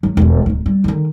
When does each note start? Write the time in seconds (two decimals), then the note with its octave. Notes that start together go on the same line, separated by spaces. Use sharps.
0.03 F#3 G#3
0.17 E1 F2
0.46 D1 D#3
0.66 G3
0.84 D3 D#3